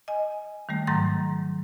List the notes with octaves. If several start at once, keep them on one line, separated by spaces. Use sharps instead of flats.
D#5 G#5
D#3 G3 A3
G#2 D#3 F#3 A#5 A6 A#6